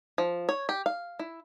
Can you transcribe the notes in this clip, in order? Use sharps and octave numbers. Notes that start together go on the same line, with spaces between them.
F3
C#5
G4
F5
E4